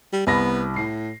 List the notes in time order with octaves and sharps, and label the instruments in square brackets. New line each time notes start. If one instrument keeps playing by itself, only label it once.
[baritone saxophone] G3
[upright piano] C2 B5 A#6 [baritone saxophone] B3
[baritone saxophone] A2 [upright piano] C7